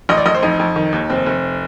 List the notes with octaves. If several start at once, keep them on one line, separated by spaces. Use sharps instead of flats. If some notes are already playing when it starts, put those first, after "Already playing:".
A1 D#5
D5
A1 D#5
C5
F2 D#4
F2
D#3
D#2
F1 C4
F1